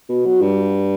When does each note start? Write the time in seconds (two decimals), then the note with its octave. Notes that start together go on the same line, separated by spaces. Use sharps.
0.09 B2
0.26 F#3
0.42 G2